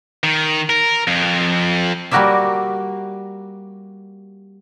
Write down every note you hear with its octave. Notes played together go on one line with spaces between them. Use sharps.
D#3
A#4
F2
G3 A#3 F#4 A#4 D5 E5